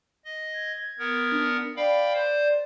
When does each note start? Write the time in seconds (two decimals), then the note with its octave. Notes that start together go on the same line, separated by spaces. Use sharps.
0.25 D#5
0.53 G#6
0.99 B3 A#4
1.32 D4
1.76 D5 F5 G5 B5
2.14 C5